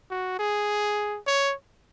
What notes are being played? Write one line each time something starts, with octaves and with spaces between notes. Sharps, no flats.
F#4
G#4
C#5